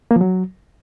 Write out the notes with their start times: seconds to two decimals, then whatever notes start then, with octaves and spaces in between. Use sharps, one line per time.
0.11 A#3
0.16 F3
0.21 F#3